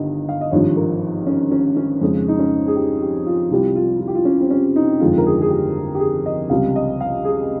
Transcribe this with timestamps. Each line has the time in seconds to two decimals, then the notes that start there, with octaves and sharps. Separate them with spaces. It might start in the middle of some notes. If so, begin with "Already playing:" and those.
Already playing: G1 G2 D#3 D#5
0.29 F5
0.41 D#5
0.52 G#1 G2 F3 C#5
0.77 A#4
1.27 C#4
1.52 C#4
1.77 C#4
2.01 F2 C#3 G#3
2.28 D#4
2.39 C#4
2.67 G#4
2.76 G4
3.02 G4
3.26 F4
3.50 C2 C3 G3 F4
3.75 F4
4.01 F4
4.07 G4
4.15 F4
4.25 C#4
4.41 C4
4.51 C#4
4.76 D#4
5.00 G1 F2 D#3 G#3 F4
5.18 A#4
5.26 G#4
5.41 G#4
5.50 G4
5.95 G4
6.00 G#4
6.26 D#5
6.50 C#2 C3 G3 F5
6.76 D#5
7.01 F5
7.25 G#4